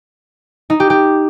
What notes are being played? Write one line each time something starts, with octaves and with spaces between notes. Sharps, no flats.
D#4
G4
G4